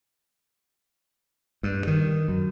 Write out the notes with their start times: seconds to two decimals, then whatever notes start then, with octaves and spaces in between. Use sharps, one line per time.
1.63 G2
1.87 D#3
2.28 F#2